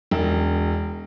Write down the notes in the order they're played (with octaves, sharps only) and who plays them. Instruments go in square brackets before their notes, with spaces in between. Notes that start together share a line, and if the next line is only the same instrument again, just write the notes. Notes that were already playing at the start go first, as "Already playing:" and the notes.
[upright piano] E1